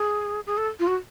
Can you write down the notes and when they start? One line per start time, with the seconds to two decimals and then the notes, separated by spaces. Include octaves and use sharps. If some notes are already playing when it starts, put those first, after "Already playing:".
Already playing: G#4
0.47 G#4
0.58 A4
0.80 F4
0.87 F#4